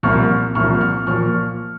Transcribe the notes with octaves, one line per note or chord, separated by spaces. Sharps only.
C2 A#2 F3 C#6 F6
C2 A#2 F3 C#6 F6
C#6 F6
A#2 F3 C#6 F6